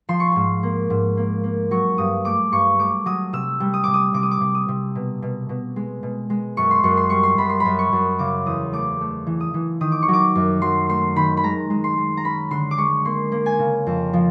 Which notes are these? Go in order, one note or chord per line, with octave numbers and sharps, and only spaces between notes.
F3 C6
C#6
G#2 C6
A#3
G#2
A#3
A#3
F#3 C#6
G2 D#6
A3 D6
G2 C#6
A3 D6
F#3 D#6
C3 E6
G3
D#6
C3 D6
D#6
C3 D6
D#6
D6
C3
D#6
C3
B2
B2
B2
G#3
B2
G#3
F#2 C#6
C6
F#2 C#6
C6
G3 C#6
C6
F#2 B5
C6
F#2 B5
C#6
F#2
C#3 D6
E2 D#6
A3 D6
A3
E3
D#6
E3
D#3 D#6
D6
C#6
F#3
D6
F#2
F#3 C6
A3 C6
D#3 B5
B5
G#3 A#5
G#3
C6
G#3
A#5
C#4 B5
D3 C6
D6
G#3 C#6
A#3 C6
A#3
G#5
C#3
F2
F3